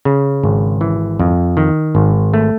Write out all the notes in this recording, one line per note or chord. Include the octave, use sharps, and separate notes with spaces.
C#3
G#1
E3
F2
D#3
G#1
A3